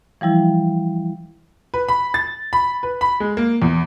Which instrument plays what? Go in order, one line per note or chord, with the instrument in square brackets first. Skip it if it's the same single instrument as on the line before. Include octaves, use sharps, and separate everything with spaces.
[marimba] E3 F3 G3 E4
[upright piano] B4
B5
A6
B5
B4
B5
G#3
A#3
E2